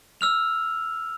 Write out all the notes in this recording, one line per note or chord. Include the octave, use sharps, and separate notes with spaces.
E6 F6 F7